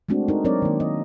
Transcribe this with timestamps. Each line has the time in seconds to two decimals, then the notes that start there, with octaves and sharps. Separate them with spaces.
0.09 G#3 A3 C4 D4 F#4
0.28 D#4 A#4
0.44 F#3 C4 D4 A#4 C#5 D5
0.62 D#3 A#3
0.80 D#5